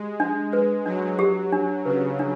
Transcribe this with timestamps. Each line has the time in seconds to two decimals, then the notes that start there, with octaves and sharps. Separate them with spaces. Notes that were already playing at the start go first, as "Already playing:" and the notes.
Already playing: G#3 G4
0.20 G#3 D4
0.52 G#3 B4
0.85 F#3 D4
1.19 G4
1.52 D4
1.85 C#3 B4
2.19 D4